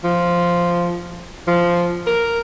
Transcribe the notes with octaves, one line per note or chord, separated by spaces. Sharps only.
F3
F3
A#4